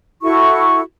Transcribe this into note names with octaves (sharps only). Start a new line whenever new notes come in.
E4 F#4 A4 C#6